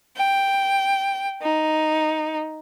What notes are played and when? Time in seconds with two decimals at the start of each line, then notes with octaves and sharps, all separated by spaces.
0.16 G5
1.41 D#4